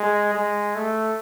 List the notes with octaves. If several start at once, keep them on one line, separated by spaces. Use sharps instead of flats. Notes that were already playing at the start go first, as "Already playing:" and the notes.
Already playing: G#3
G#3
A3